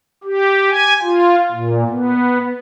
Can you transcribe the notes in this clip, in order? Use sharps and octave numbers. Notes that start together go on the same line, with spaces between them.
G4
G#5
F4
A#2
B3